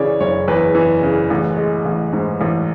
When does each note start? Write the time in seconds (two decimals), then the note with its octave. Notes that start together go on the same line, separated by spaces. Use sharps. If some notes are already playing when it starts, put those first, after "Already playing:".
Already playing: C#3 E3 C#5 D5
0.20 F#1 C#5
0.48 E2 B4
0.75 E3
1.03 C#3
1.30 A1
1.57 G#3
1.85 A1
2.13 G#2
2.41 A1